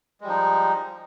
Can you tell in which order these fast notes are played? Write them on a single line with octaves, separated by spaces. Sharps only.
G#3 G3 F3 D#4